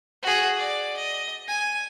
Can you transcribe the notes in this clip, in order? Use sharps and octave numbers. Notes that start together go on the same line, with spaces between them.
F#4 G#4
D5
D#5
G#5